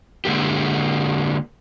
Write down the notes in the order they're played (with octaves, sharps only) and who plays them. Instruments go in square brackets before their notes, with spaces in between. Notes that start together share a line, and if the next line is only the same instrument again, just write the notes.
[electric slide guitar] D3 G#3 A#3 G4